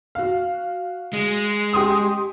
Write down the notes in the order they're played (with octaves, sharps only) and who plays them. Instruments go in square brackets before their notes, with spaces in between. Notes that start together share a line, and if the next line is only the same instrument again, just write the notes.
[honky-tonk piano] F#4 F5
[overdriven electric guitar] G#3
[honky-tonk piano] G4 C6 D#6